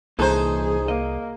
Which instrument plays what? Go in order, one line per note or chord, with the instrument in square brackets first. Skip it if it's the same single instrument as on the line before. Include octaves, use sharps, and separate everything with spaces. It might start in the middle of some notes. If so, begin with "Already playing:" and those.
[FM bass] C2 [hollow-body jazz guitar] A#2 E3 A4 [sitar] D#4 C5 [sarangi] G#4
[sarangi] A#3 [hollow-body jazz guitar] D#5